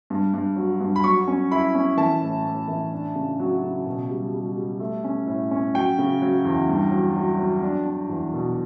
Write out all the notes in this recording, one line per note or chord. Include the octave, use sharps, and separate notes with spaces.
G2
G2
F#3
G2
B5
F#3 C#6
C#4
E4 B5
C#4
E3 A5
A2
A2
E3
D4
C#3
F#3
C#3
B2
G3
G3
G3
A3
C#4
A2
C#4
F#3 G5
C#3
F#3
E2
G2
F#3
F#3
F#3
D4
D4
E2
B2